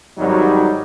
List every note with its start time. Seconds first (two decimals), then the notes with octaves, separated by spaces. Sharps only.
0.18 G#1 F#3 G3 D#4